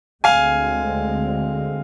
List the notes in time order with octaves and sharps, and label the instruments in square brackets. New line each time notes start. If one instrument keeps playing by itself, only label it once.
[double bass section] D2 D3 G#3 C4 [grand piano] F5 G#5